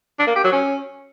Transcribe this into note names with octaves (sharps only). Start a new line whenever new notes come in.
D4
A#3
G4
F#3
C#4